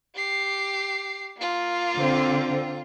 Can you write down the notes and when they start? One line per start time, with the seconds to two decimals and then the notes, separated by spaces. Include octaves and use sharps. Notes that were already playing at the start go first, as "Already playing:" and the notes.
0.15 G4 C7
1.37 A#3 F4
1.97 D3 C4